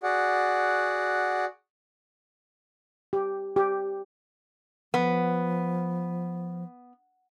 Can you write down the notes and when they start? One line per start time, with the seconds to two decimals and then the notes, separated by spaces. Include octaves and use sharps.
0.03 F#4 G#4 D5 F#5
3.13 G4
3.56 G4
4.94 F3 B3